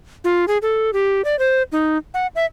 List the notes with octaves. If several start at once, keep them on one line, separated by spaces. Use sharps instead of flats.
F4
G#4
A4
G4
D5
C5
D#4
F#5
E5